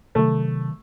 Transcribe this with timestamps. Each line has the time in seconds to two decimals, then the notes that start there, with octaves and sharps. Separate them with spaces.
0.15 C3 D#3 F#3 A3